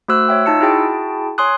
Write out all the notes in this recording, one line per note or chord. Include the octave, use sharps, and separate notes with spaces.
A3 F#4 C5 E6 F#6
C#5 E5 G5
D#4 F4 A5 E6 C#7
E4 F#4 G#4 G5 A5
C#5 G#5 C6 D#6 F#6